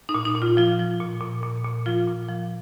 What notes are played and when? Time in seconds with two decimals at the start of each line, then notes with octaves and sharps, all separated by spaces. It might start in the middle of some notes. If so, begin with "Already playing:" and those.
0.09 D#4
0.14 A#2
0.25 D#4
0.36 A#2
0.42 F4
0.57 F3 F4
0.79 F3
1.00 A#2
1.21 A#2
1.43 A#2
1.64 A#2
1.86 F3 F4
2.07 A#2
2.28 F3